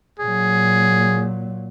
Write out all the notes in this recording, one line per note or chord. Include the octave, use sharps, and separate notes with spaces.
A#2 F#3 G#4